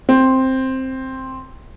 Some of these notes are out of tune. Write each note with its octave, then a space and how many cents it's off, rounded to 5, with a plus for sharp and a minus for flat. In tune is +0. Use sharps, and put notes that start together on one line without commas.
C4 +5